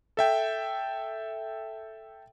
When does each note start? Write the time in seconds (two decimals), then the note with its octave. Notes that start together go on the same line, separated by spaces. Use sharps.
0.17 A4 E5 G5